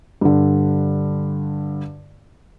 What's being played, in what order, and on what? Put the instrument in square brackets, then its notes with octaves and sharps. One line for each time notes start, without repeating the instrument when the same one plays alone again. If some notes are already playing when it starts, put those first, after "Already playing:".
[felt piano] G2 D3